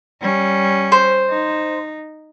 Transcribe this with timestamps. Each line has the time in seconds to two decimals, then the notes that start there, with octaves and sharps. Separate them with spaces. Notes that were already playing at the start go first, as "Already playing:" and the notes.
0.21 G3 C#4
0.92 C5
1.30 D#4